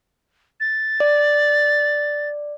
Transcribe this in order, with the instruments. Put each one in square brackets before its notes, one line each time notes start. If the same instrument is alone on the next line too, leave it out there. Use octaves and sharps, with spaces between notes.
[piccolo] A6
[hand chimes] D5